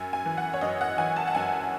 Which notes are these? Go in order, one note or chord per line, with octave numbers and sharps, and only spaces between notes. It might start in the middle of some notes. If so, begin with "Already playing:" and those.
Already playing: F#2 G#5
G#5
E3
F#5
C#5
F#2 D#5
F#5
E3 G#5
A5
F#5
F#2 G#5